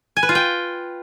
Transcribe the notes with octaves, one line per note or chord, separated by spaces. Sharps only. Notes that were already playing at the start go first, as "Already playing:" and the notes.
G#5
B4
F4
G5